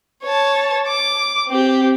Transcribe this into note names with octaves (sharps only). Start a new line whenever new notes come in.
C#5 A5
D6
C4 G4